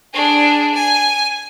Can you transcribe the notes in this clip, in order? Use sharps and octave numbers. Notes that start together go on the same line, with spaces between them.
D4 G#4
G#5